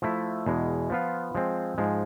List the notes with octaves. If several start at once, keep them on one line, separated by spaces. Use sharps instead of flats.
F3 A3 E4
E2 B2 G#3
F3 B3 F4
F3 G#3 C4
G#2 F3 G#3